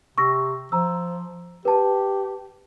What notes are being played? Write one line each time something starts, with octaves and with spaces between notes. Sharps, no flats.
C3 C#6 E6 A#6
F3 A#5 E6
G4 B4 A5